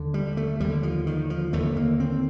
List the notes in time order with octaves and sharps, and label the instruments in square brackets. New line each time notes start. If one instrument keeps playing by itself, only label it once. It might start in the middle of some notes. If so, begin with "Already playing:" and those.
Already playing: [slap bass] D#2 D3
G3
A3
D#2 D3 G3
F3
D#3
F3
D#2 D3 A3
A#3
C4